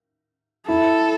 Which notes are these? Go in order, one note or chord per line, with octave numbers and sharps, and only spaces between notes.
E4 A4